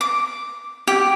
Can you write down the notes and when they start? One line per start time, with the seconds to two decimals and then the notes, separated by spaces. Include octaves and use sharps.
0.01 D6
0.87 G4